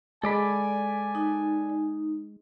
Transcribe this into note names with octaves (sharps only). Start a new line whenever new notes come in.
G#3 A4 D5 G#5 B5
D#4